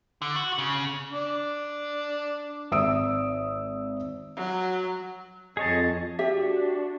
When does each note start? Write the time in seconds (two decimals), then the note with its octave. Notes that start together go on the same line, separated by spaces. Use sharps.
0.22 D3
0.36 F#4
0.58 C#3
1.12 D4 D6
2.71 G#1 E5 D#6 E6 D7
4.36 F#3
5.57 F2 G#4 C#5 D#5 A5
6.19 D4 F#4 G4 E5